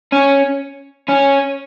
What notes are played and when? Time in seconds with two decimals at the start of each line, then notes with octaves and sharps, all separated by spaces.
0.12 C#4
1.09 C#4